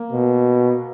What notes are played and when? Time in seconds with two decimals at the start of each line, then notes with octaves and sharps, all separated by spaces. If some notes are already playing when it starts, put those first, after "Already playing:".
Already playing: A#3
0.12 B2